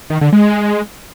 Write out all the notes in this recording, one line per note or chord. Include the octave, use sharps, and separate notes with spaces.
D#3
D3
G#3